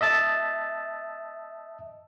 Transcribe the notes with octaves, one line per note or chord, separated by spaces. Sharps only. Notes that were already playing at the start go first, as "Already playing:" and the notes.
D#5 E5 A5 A6